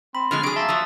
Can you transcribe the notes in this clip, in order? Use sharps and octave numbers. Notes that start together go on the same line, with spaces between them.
C4 B5
D3 F3 G#3 F6
F#3 G#4 D7
A#3 E5 A5 C6 A6
F3 F#3 D#6 E6